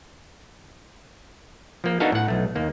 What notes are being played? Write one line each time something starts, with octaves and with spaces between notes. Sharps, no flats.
F3 A#3
B3 D4 D#4 F#4 A4 F5
A2 F#5
B1 A3
D#2 A#3